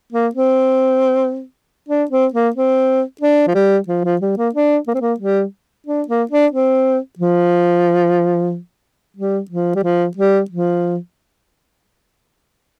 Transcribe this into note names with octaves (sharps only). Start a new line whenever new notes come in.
A#3
C4
D4
C4
A#3
C4
D4
F3
G3
F3
F3
G3
A#3
D4
A#3
C4
A#3
G3
D4
A#3
D4
C4
F3
G3
F3
G3
F3
G3
F3